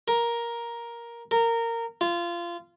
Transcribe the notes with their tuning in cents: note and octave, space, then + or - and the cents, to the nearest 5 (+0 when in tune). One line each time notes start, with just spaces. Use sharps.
A#4 +10
A#4 -15
F4 -20